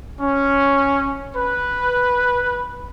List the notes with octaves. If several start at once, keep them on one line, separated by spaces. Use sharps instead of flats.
C#4
B4